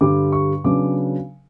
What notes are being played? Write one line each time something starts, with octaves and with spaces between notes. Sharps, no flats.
G2 D3 G3 D6
C#6
C#3 F#3 B3 D4 D6